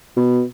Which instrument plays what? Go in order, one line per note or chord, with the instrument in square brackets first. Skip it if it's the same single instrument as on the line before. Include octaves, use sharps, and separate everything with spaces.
[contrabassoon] B2